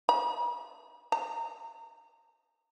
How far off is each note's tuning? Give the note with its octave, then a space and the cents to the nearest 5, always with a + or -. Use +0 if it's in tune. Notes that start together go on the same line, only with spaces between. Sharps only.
A#5 +40
A#5 -25